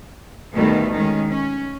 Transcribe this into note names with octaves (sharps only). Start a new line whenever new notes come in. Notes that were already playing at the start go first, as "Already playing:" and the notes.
D2 B2 D#3 G3 A3 B3
D#3 G#3 C#4
C#4